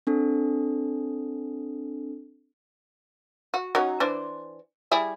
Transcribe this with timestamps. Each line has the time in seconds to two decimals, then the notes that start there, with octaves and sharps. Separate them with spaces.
0.07 C4 D4 A4
3.54 F#4
3.75 F#3 C#4 D#4
4.00 E3 D4 C5
4.91 G3 E4 G#4